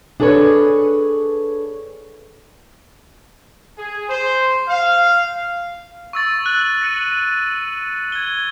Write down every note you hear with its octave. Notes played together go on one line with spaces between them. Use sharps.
D4 G#4 A4 B4 C#5
G#4
C5
F5
C#6 E6 A6
F#6 F#7
A#6 C#7 D#7
G#6 G7